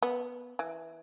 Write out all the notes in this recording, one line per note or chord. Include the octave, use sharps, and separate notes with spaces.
B3
E3